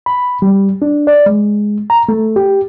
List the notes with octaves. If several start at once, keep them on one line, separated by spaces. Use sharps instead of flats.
B5
G3
D4
D5
G#3
A#5
A3
G4